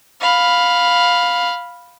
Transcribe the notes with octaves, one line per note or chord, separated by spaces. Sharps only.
F5 B5